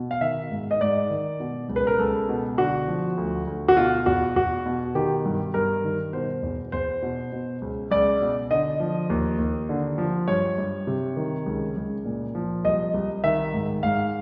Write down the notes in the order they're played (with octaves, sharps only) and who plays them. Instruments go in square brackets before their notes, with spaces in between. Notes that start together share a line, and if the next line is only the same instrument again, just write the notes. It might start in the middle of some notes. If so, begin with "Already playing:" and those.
Already playing: [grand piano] B2
F5
D#3 E5
G#2
D#5
G#2 D5
D#3
B2
C#2
B4
A#4
C#2 A4
B2
D3 F#4
F3
D2
D2
F#4
B2 F4
E2 F#4
E2 F#4
B2
D#3 G4
G2
G2 A#4
D#3
B2 C5
E2
E2 C5
B2
B2
C#2
C#2 D5
B2
D3 D#5
F3
D#2
D#2
D3
F3
G2 C#5
G2
C3
D#3
C#2
C#2
A#2
F3
C2 D#5
C2
D#3 E5
G#2
G#2 F5